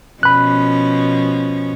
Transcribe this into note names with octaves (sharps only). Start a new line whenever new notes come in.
B2 F3 C#4 B5 F#6